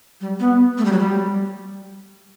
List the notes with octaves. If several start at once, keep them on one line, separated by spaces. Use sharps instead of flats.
G3
B3
A3
G3
F#3
G3